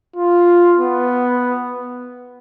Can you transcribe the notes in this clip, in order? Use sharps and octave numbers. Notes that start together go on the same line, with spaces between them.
F4
B3